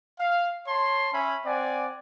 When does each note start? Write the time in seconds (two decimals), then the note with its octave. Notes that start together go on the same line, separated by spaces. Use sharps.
0.20 F5
0.67 C#5 A5 C6
1.13 C#4 C#5 E5 B5
1.45 C4 D5 F#5 G#5